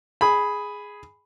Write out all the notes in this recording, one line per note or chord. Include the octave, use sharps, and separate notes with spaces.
G#4 B5